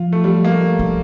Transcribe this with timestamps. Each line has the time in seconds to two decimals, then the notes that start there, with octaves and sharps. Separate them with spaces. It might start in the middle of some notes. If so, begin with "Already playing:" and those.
Already playing: F3 F4
0.13 A3
0.24 G3
0.45 A#3
0.51 A3
0.79 F3